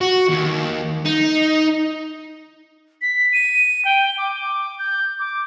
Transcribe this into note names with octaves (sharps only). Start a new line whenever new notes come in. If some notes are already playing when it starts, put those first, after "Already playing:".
F#4
D#2
D#4
B6
D#7
G5
D6
G6
D6